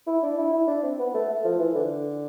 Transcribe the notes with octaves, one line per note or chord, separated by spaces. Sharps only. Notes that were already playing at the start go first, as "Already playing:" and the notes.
E4
D4
E4
E4
D4
C4
B3
A3
A3
F3
E3
D3